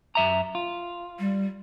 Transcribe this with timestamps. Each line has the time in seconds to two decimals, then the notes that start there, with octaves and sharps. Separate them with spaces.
0.15 F#2 E5 A#5
0.55 F4
1.19 G3